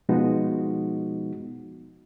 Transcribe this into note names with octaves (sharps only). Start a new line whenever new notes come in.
B2 F3 G#3 B3 D#4 F#4